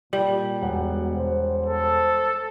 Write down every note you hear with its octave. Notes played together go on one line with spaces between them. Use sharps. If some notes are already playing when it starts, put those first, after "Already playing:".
A#2 G3 F#7
E1 B2 F#5
C5
A4